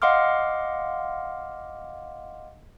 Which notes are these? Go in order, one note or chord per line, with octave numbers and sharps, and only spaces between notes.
D#5 F5 F#5 C6 D6 F6